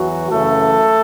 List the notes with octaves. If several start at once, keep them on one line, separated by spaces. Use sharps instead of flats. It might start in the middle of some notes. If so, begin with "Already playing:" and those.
Already playing: E2 E3 F#3 F#4
F#2 C#3 E3 A3 A4